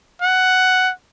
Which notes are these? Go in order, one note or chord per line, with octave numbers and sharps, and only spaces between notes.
F#5